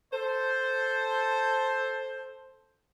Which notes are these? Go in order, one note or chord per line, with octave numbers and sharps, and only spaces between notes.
A4 C5